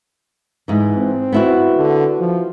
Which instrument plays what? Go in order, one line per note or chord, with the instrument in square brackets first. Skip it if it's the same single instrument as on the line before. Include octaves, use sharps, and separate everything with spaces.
[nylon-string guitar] G#2 E3
[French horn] C4
[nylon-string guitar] B3 E4 F#4
[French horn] D3
F3